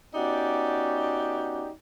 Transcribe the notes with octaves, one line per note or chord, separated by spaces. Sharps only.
B3 C#4 D#4 F#4 G4 D5